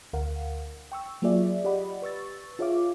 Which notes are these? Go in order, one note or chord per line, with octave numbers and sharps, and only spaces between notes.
D2 A#4 F5 F#5
G5 C#6 E6
F#3 A#3 F4 G#4 D5 E5
G4 D5 D#5 F#5 B5
B4 C#6 E6 A6
F4 G#4 C#5 E5 F5 D6